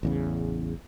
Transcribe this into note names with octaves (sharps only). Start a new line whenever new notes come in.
A1 E2 C#3